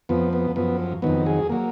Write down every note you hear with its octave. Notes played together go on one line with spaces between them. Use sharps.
F2 F3 B3
B3
F#2 F3 B3
F2 D#3 F#3 B3
G#4
F#3 A#3